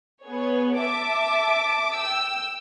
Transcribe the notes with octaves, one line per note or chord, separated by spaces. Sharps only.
B3 G#4 C#5
E5 A5 D6
G5 E6